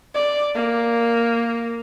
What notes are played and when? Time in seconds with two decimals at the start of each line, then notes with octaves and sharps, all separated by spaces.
0.15 D5
0.55 A#3